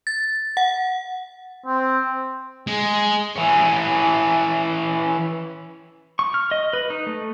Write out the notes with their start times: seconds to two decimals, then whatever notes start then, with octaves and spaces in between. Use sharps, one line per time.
0.07 A6
0.57 F#5
1.66 C4
2.67 G#3
3.36 E3 C#4
6.19 C#6
6.34 F6
6.51 D#5
6.73 B4
6.90 D#4
7.07 A3